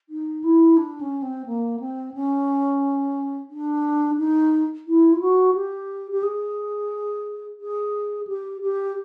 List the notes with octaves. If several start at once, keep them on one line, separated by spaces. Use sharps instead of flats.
D#4
E4
D4
C#4
C4
A#3
C4
C#4
D4
D#4
E4
F4
F#4
G4
G4
G#4
G#4
G4
G4